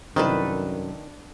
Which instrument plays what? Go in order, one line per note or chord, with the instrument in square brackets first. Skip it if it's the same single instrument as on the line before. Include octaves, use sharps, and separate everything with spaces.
[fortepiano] C2 E4 C5 [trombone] F#2 [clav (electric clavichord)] D#3 [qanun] D4 A4 B4